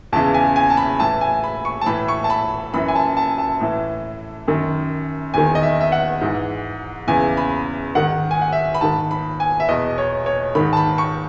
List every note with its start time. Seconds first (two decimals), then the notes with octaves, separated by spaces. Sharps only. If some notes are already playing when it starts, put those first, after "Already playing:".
0.12 E2 C#3 E3 A5
0.34 G#5
0.56 G#5
0.70 A5
0.77 B5
1.00 A2 E3 A5
1.21 G#5
1.44 B5
1.65 C#6
1.81 A5
1.86 A2 E3 B5
2.08 C#6
2.24 A5
2.30 B5
2.74 F#2 E3 B5
2.88 G#5
2.95 A5
3.17 A5
3.38 A5
3.61 A2 E3
4.48 F#2 D#3
5.34 E2 D#3 G#5
5.55 D#5
5.63 E5
5.81 E5
5.92 F#5
6.21 G#2 E3
7.07 E2 C#3 E3 G#5
7.37 B5
7.95 G#2 D#3 F#5
8.31 G#5
8.42 F#5
8.52 E5
8.75 B5
8.81 G#2 D#3 A5
9.11 B5
9.40 G#5
9.60 E5
9.68 E2 B2 D#5
9.98 C#5
10.26 C#5
10.55 G#2 D#3 B5
10.73 A5
10.77 B5
10.98 C#6